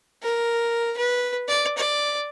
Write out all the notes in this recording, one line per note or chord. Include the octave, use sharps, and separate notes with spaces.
A#4
B4
D5
D5